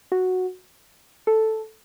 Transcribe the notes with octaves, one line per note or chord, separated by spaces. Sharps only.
F#4
A4